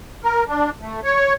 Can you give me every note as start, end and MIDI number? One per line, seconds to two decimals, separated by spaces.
0.24 0.44 70
0.48 0.70 62
0.81 1.00 57
1.04 1.33 73